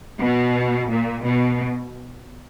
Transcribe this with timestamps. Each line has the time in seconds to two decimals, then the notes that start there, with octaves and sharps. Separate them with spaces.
0.21 B2
0.90 A#2
1.25 B2